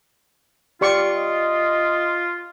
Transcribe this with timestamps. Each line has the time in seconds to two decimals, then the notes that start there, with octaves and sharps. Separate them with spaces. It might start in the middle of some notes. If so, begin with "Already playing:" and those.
0.81 F4 G4 D5 C#6
1.14 D#5